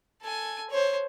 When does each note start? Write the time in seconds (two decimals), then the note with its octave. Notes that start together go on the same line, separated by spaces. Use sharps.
0.22 A4 G#5
0.70 C5 C#5